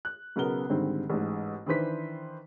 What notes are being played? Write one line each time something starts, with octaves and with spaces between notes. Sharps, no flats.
F#6
B1 C#3 B3 A#4 G7
G#2 D3 D#3 G3 C4
A1 G#2
D#3 E3 D4 B4 C5 B6